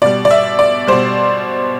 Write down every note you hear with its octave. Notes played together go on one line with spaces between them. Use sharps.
B2 G3 D5
D5
E5
D5
B2 G3 C5